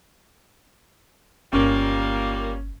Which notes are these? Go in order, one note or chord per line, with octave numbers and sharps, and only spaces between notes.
G1 A#2 G3 A#3 C#4